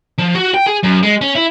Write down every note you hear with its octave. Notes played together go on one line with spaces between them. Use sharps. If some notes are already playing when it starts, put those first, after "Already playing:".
F3
F#4
G5
G#4
F#2
G#3
C#4
E4